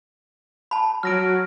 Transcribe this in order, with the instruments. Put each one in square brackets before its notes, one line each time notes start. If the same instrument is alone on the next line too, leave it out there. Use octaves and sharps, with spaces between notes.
[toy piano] A5 B5
[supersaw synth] F#3 [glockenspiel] F6 A#6 D7